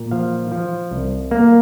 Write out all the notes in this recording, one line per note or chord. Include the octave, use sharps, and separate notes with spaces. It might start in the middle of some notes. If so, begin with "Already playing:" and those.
Already playing: A#2
F3 F5
F3
C2
A#3